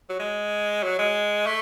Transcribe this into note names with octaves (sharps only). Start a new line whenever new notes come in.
F#3
G#3
F#3
G#3
A3